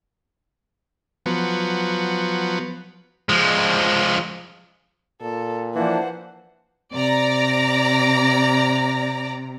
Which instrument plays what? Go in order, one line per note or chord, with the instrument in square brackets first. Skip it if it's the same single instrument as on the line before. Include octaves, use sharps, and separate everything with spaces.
[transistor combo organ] F3 F#3 B3
[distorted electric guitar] F3 G#3
[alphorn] A#2 [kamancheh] A4
[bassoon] E3 [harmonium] F3 A#3 D4 [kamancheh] C5 F#5
[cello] C3 [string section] D5 A#5